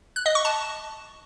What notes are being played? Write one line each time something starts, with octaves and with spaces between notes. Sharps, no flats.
F#6
D#5
C#6
A5